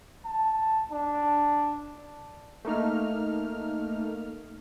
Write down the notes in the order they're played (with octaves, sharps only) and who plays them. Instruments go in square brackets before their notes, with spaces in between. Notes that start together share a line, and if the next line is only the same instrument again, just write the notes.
[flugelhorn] A5
D4
[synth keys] A3 A#3 D#4 F6